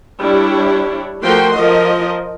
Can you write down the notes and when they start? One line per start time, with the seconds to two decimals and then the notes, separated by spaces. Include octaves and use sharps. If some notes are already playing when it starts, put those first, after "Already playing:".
0.19 G3 D4 E4 C#5
1.22 F3 A3 F#4 A#4 G5 C6
1.56 F3 A#4 D#5